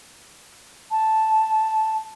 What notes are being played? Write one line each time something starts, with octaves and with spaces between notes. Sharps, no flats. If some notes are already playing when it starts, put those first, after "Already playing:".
A5